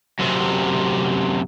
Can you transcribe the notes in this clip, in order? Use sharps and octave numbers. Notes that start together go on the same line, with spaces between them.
F#2 C3